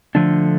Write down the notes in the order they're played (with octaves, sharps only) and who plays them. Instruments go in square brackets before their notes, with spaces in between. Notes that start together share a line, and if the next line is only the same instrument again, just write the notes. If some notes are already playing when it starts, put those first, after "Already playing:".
[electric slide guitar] D3 F3 A3 D4